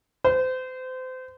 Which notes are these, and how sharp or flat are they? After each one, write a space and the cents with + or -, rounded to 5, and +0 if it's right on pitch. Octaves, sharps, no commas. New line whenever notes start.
C5 -30